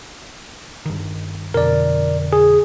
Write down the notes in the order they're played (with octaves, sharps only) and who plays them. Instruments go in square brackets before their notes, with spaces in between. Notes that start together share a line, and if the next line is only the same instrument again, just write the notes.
[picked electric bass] G2 D#3
[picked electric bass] F2 B2 D3 [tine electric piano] A#4 D5
[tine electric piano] G#4